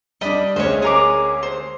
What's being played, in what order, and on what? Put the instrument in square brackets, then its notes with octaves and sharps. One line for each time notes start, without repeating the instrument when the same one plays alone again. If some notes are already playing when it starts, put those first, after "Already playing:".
[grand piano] G3 D4 [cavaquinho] D#5 B5
[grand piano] D2 G#3 C#4 [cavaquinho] C5 C#5
[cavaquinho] G#4 A#4 D6
C5